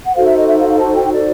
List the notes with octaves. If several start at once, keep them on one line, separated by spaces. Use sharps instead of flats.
F#5
D#4 F#4 A4 C5 F5
E5
D#5
E5
F5
F5
A5
G5
D5